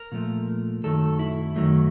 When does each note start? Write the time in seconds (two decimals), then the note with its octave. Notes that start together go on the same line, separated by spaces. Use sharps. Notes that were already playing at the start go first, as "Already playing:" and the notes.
Already playing: A#4
0.12 A#2 F3 A3
0.84 F#2 D#3 F#3 A3 A4
1.19 E4
1.56 F#2 D#3 F#3 A3